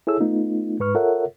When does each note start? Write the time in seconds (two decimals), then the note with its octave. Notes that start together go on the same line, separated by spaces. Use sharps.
0.07 E4 G#4 A4 C#5 E6
0.20 A3 B3 D#4 F4
0.80 G#2 B4 C#6 F6
0.95 F4 A4 A#4 C#5 E5 F#5